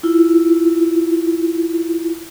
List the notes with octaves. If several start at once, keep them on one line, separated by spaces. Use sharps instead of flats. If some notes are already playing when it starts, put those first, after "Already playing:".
E4 F4